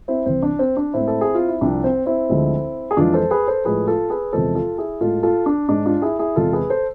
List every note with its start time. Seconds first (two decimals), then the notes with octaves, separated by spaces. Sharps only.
0.08 C4 E4
0.26 C2 C3 E3 C4
0.43 D4
0.59 C4
0.77 D4
0.94 A2 G#3 C4 E4
1.08 A4
1.21 G#4
1.35 F4
1.48 E4
1.61 C2 C3 F3 D4
1.84 C4
2.06 C4 E4
2.29 D2 D3 F3 G#3
2.91 G#4
2.97 F2 E3 G#3 D4 F4
3.14 A4 C5
3.31 G#4 B4
3.48 A4 C5
3.65 A2 F3 G#3 G#4 B4
3.88 F4 A4
4.10 G#4 B4
4.33 E2 C3 F3 G#3 A4 C5
4.55 F4 A4
4.78 E4 G#4
5.01 A2 G#3 F4 A4
5.23 F4 A4
5.46 D4
5.69 G#2 G#3 D4
5.86 D4 F4
6.02 E4 G#4
6.19 E4 G#4
6.36 E2 C3 G#3 F4 A4
6.53 G#4 B4
6.70 A4 C5